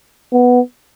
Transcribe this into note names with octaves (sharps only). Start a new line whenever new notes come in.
B3